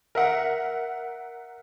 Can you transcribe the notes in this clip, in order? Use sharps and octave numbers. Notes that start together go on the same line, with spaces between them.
A#4 E5 F#5